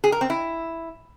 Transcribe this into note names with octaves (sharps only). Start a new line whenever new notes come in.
G#4
A#4
C4
E4